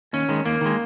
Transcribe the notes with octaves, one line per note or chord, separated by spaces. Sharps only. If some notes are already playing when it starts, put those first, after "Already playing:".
D#2 C#4
D#3 G#3
D#2 A#3
D#3 G#3